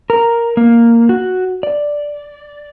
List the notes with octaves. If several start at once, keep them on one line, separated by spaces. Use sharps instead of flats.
A#4
A#3
F#4
D5